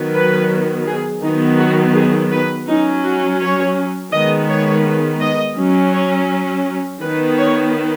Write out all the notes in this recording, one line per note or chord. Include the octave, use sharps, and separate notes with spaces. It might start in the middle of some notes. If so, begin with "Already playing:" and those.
Already playing: D#3 F#3 B3
B4
G#4
D#3 F#3 B3 D#4
F#4
G#4
B4
F#3 C#4 D#4
F#4
C#5
D#3 G#3 B3 D#5
C#5
D#5
F#3 C#4
C#5
D#3 B3 B4
C#5